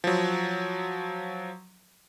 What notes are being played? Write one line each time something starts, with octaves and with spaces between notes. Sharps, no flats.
F3 F#3